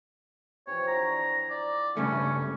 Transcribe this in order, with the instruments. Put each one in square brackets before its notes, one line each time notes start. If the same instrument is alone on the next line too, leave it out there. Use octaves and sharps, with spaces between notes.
[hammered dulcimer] C3 E3 F3 [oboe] C#5
[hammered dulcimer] D3 E4 A4 [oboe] A#5
[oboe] D5
[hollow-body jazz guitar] G2 C#3 A3 [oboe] C#4